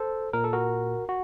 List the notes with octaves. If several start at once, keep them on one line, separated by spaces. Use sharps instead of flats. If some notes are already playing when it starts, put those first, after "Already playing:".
Already playing: A4 C5
A#2 A#4
A4
F#4 A#4
F#4